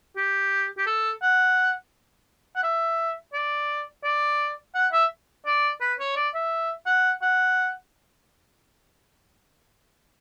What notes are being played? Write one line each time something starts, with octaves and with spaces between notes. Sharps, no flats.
G4
G4
A4
F#5
F#5
E5
D5
D5
F#5
E5
D5
B4
C#5
D5
E5
F#5
F#5